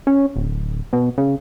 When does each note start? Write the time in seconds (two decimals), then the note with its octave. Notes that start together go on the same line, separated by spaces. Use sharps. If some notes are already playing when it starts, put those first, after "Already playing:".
0.07 C#4
0.36 D1
0.93 B2
1.18 C#3